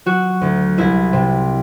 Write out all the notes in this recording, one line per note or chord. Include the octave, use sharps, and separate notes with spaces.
F#3 F#4
D2
C2 E4
C3